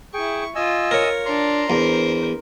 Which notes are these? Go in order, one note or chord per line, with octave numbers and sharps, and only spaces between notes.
E4 G#4 G5 C#6
F4 D#5 G#5 E6
A#4 C#5
D4 A#5 C6
E2 A#4 C5